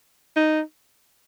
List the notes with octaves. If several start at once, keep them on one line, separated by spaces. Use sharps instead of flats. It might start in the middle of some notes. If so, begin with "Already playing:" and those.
D#4